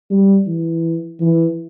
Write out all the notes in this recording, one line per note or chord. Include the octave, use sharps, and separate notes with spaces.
G3
E3
E3